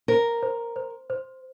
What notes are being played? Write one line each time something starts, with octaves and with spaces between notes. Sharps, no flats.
A#4 C5
C5
C5
C5